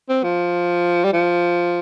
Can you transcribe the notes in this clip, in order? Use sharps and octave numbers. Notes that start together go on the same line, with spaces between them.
C4
F3
G3
F3